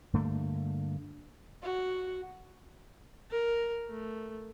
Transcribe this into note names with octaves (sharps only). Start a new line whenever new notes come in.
G2 D3 A3 A#3
F#4
A#4
A3